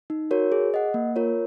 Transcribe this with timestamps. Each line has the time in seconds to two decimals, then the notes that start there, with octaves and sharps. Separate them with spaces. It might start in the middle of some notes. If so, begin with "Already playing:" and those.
0.10 D#4
0.31 F#4 A#4 C#5
0.52 G#4
0.74 D#5 F#5
0.94 A#3
1.16 F4 A#4 C#5